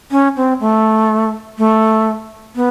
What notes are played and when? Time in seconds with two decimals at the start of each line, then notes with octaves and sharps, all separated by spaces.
0.11 C#4
0.36 C4
0.60 A3
1.58 A3
2.56 B3